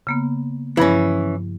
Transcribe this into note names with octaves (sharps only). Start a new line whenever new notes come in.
C#3 A#3 B3
G2 E3 F3 C#4 E4